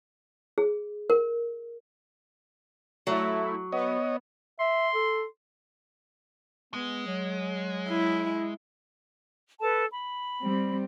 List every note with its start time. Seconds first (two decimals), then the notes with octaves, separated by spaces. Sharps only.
0.58 G#4
1.10 A#4
3.07 F#3 A3 E4
3.72 B3 C#5 D#5
4.60 E5 C6
4.95 A4
6.74 G#3 B3
7.07 F#3
7.89 E4
9.61 A4 B4 A5
9.90 B5
10.44 G3 C4